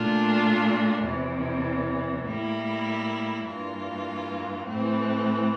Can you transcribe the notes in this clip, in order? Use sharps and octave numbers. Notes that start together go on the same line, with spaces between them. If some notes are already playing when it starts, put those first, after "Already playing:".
Already playing: A#2 A3 D4 F4
E2 C3 E3
A2 G3 A#3 E4
G2 E3 A#3 F4
A2 E3 A3 C4